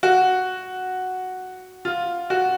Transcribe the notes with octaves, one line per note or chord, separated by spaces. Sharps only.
F#4
F4
F#4